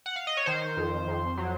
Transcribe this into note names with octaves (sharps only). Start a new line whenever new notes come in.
F#5
F5
D#5
C#5
D#3 C5
F2
F2
F#3